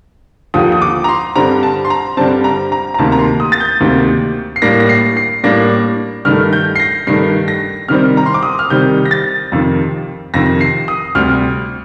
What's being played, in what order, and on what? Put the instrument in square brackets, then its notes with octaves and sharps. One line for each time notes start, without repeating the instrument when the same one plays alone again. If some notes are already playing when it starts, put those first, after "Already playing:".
[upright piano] D#2 D3 F3 D#6
D#6
D6
A#5
C6
G2 D3 G3 C4 A#5
A5
C6
A#5
G2 D3 G3 C4 A5
A#5
A#5
A#5
D2 C3 D#3 A#3 A5
A#5
C6
D#6
A6
G6
D2 C3 D#3 A#3
C7
A2 G3 A#3 D4 A#6
A#6
C7
C7
A2 G3 A#3 D4 A#6
G2 D#3 A3 F6
G6
C7
A#6
G2 D#3 A3 C7
A#6
C3 D#3 G3 C4 F6
A#5
C6
D6
D#6
F6
C3 D#3 G3 C4 G6
A#6
A6
F2 C3 D#3
F2 C3 D#3 A#6
C7
D#6
D2 C3 G3 F6